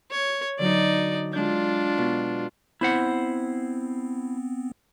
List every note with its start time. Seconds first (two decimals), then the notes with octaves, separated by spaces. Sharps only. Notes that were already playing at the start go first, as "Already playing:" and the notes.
0.11 C#5
0.59 D3 F#3 D#4 D5
1.33 G#3 D4 F4 G6
1.98 B2
2.81 B3 C4 E4 C5 F#5